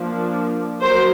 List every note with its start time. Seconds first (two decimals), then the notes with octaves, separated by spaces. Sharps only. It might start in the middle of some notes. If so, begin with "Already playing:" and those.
Already playing: F3 A#3 D4
0.81 F#3 A#4 C5